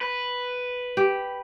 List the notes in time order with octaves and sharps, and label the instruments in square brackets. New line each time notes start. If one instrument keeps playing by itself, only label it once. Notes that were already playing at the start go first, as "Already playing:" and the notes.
[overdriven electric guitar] B4
[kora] G4